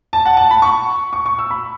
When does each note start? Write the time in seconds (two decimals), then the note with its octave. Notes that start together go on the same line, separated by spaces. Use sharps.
0.13 A5
0.26 F#5
0.37 A5
0.51 B5
0.62 C#6
1.13 C#6
1.26 C#6
1.39 E6
1.51 B5